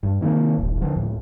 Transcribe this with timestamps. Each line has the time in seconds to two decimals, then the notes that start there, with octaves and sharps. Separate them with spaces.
0.03 G2
0.21 C3 D#3 A3 A#3
0.58 D#1 A1
0.81 D3 F3
0.96 C#2 A2